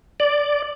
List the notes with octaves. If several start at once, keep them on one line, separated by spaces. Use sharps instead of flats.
D5